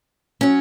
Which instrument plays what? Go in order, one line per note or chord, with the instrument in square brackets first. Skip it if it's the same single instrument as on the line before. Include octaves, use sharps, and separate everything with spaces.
[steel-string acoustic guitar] F#3 C#4